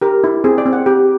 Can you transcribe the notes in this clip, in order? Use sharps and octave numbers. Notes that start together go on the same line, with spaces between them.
G4 A#4
E4
C4 G#4
D5
C4
F#5
G4